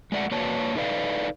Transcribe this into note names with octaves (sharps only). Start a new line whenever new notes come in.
G#3 A3 D5 E5 F#5
A#3 F#4 B4 C#5 D5 A5
D#4 A4 B4 D5 F5